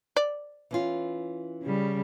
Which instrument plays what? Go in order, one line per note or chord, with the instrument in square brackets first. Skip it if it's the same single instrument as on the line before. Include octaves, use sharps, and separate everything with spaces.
[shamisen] D5
[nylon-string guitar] E3 C#4 F4
[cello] C#3 G3